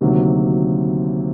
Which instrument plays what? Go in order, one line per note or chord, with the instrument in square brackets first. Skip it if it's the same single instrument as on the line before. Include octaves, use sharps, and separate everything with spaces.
[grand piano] D2 C3 D#3 F#3 A#3